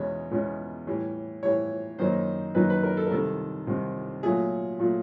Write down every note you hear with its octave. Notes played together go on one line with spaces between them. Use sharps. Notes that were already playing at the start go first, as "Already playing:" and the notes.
Already playing: E2 B2 G#3 C#4 C#5
E2 B2 G#3 C#4
A2 E3 G3
A2 E3 G3 C#5
F#2 D#3 F#3 A#3 D#4 C5
F#2 D#3 F#3 A#3 D#4 B4
B4
A#4
A4
A#4
C2 C3 D#3 A4
C2 C3 D#3
A#2 F#3 A3 G#4
A#2 F#3 A3